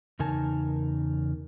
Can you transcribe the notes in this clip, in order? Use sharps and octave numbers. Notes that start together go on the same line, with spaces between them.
E2 C#3 D#4 A#4 G#5 A5